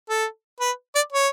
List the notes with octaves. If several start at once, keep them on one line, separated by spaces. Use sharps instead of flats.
A4
B4
D5
C#5